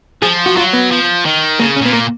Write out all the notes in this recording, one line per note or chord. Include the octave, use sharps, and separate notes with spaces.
F3 G#4
F#4
F#3 F4
B3
F3
D#3
C#3 A#3
C#4
A#2 B3
A#3